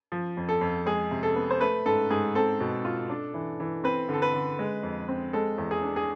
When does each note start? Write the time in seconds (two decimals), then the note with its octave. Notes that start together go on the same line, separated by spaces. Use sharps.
0.12 F3
0.37 F2
0.49 A4
0.61 F2
0.86 G#3 G#4
1.11 C3
1.23 A4
1.36 B3
1.51 C5
1.61 A3 B4
1.86 G#2 A4
2.10 G#2 G#4
2.35 C4 A4
2.60 B2
2.85 F4
3.09 D4
3.34 E3
3.60 E3
3.84 C4 B4
4.09 D3 A4
4.22 B4
4.34 D3
4.59 G#3
4.83 F2
5.08 C4
5.33 G#3 A4
5.58 E2
5.71 G#4
5.83 D4
5.96 G#4